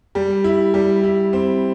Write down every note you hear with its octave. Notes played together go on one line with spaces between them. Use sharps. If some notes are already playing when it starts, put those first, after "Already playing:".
G3
E4
G3
E4
C4